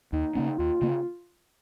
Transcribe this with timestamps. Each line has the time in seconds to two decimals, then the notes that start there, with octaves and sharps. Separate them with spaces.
0.12 D#2 D#4
0.35 C#3 A#3 C#4
0.58 D#2 F4
0.82 C#3 A#3